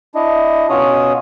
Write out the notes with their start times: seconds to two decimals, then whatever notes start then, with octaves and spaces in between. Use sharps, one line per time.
0.15 D4 E4 D#5
0.69 B2 C#4 F4 F#4 C#5 D#6